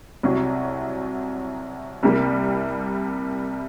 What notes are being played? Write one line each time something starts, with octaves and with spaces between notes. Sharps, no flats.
C2 C3 F#3
C2 C3 G3 A#3